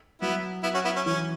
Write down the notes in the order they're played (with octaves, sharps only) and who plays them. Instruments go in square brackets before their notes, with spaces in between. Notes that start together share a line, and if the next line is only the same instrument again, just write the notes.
[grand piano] F#3 [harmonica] B3 E4
[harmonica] B3 E4
C#4 F#4
B3 E4
C#4
[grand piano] E3 [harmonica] C#4